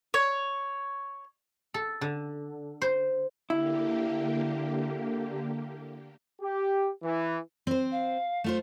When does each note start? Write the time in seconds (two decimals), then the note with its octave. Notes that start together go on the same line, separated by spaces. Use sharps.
0.14 C#5
1.74 A4
2.01 D3
2.82 C5
3.50 D3 A#3 E4 G4
6.41 G4
7.03 E3
7.67 C4 C5
7.91 F5
8.44 A3 F4 C5